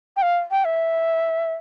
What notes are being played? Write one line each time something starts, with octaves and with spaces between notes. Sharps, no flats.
G5
F5
G5
E5